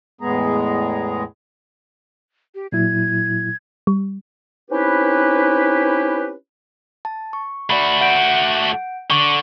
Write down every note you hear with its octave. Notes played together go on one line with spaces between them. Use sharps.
E2 A2 G#3 B3 G#4 A#5
G4
A#2 F#3 E4 G#6
G3
C4 C#4 D#4 E4 G4 B4
A5
C#6
A3 F#4 D5 B5
F#5 G6 D7
D3 C#6 B6